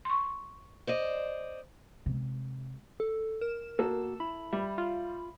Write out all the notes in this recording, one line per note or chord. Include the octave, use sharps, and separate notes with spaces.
C6 C#6
C5 D5 D#5
C3 G#3
A4
A#4 E7
B2 A#3 F#4 A4
E4 B5
G3 E5
F4